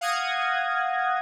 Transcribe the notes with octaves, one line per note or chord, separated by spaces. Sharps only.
F5 F#5 D#6 G#6 A#6